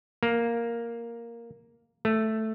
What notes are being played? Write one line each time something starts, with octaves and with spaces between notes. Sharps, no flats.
A#3
A3